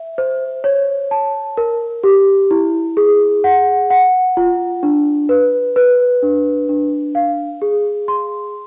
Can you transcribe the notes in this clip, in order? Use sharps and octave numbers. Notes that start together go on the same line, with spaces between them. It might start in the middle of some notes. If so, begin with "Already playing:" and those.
Already playing: E5
C5
C#5
A5
A#4
G4
E4
G#4
F#5
F#5
F4
D4
B4
B4
D4
D4
F5
G#4
C6